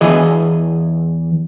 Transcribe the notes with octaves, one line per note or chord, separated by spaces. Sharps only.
E2 E3 G#4 D#5